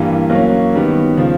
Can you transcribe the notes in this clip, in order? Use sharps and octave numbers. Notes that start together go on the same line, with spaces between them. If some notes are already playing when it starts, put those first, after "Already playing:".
Already playing: G2 E3 G3 A#3
F#3 A#3 C#4
D#3 G3 B3
C#3 F3